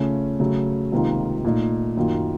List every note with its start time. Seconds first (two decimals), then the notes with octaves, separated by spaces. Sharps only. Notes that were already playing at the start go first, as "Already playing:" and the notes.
Already playing: C#3 A3 C#4 F4
0.40 C#3 F#3 A3 C#4
0.92 C#2 C3 D#3 A#3 F4
1.44 A#2 A3 D#4
1.97 F#2 D#3 A#3 F4